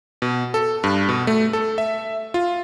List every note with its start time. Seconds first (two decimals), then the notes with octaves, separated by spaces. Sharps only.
0.22 B2
0.54 A4
0.84 G2
1.09 B2
1.27 A3
1.53 A4
1.78 E5
2.34 F4